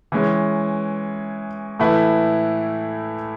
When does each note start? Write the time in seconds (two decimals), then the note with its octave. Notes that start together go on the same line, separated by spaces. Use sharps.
0.12 E3 G#3 C#4
1.80 A2 E3 A3 E4 B4